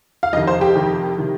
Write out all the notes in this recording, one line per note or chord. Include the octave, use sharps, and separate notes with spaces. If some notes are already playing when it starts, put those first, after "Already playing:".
F5
F2 C3 D#3 D#5
C5
G4
F2 C3 D#3
C3 D#3